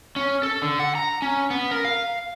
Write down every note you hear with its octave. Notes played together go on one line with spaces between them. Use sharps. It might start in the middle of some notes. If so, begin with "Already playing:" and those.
C#4
A4
D3
F#5
A#5
C#4
B3
A#4
F5